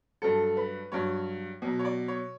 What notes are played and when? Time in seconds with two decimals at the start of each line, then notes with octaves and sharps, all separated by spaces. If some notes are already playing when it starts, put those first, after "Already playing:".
0.22 G2 F#3 A4
0.57 B4
0.92 G2 F#3 C#5
1.62 B2 F#3
1.79 C#5
1.85 D5
2.08 C#5